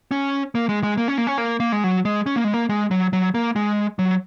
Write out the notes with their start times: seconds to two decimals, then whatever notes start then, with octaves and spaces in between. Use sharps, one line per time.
0.11 C#4
0.55 A#3
0.69 G#3
0.83 G#3
0.97 A#3
1.08 C#4
1.18 A#3
1.27 C#4
1.38 A#3
1.60 A#3
1.72 G#3
1.84 F#3
2.05 G#3
2.26 C#4
2.36 A#3
2.44 G#3
2.54 A#3
2.69 G#3
2.91 F#3
3.13 F#3
3.34 A#3
3.56 G#3
3.99 F#3